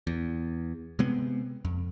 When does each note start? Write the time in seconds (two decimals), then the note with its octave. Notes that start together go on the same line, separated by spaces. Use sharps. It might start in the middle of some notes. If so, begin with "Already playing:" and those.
0.07 E2
0.99 C3 G#3 B3 C4
1.65 F2